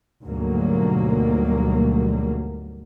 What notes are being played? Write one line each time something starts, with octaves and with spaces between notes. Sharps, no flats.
D2 G#2 B2 F#3 G3 A#3